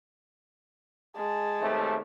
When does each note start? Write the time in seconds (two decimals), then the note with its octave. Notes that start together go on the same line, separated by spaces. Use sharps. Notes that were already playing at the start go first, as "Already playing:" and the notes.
1.16 G#3 A5
1.60 D#2 C3 A3